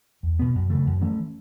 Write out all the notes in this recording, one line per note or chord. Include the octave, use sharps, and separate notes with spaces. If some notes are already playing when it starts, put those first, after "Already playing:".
E2
B2 B3
F#2
C#3 E3 A3
F#2
E3 A3 C#4